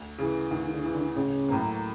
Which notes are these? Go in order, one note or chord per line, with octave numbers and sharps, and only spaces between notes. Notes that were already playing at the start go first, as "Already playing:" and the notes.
Already playing: D2
C#3 E3
D2 D#3
D#3
D3
C#3 E3
D3
A1 C#3
A2 F#3 A#3